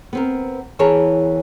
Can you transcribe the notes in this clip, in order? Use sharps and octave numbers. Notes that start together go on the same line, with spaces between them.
B3 C4 A#4
E2 E3 G#4 A#4 C#5 A5